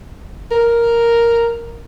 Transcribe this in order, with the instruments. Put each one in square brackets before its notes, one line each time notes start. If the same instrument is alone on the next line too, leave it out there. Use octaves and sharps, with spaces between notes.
[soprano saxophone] A#4